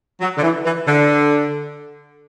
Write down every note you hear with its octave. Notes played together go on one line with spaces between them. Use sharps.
F#3
D3
E3
E3
D3